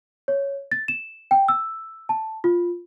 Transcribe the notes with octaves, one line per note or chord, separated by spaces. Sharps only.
C#5
A6
E7
G5
E6
A5
F4